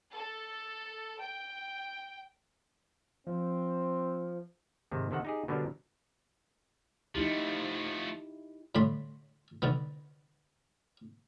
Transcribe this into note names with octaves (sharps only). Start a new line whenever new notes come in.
A4
G5
F3 C4
G#2 C3 D#3
C3 D#3 A4 F#5
D#4 G4 G#4
B2 D3 F#3 G3 D4 A#4
F3 A3 D#4 E4 G4
A2 D3 B5 C6
D3 D#3 B3